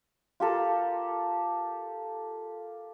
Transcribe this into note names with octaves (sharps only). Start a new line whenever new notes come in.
F4 G4 A4 A#4